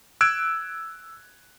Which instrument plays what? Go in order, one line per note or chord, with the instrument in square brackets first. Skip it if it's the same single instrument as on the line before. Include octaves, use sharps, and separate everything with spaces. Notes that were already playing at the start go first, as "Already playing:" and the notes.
[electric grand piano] E6 F#6 G#6 D7